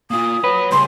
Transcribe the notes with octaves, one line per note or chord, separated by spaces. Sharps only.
A#3 F4 D#6
B4 C#5 F#5
C#3 G3 C6